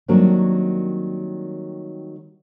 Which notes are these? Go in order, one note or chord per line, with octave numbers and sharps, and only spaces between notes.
D#3 F#3 G3 A#3 C4 D4